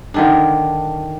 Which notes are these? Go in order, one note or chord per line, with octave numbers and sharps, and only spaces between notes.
D3 D#3 D4